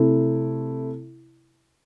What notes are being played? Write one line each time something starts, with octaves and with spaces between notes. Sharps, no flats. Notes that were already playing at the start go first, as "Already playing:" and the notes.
Already playing: C3 A3 E4